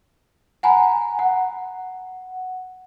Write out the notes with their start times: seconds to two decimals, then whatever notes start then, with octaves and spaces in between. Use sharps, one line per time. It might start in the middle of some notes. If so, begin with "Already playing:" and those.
0.63 F#5 G#5 A#5 B5
1.19 F#5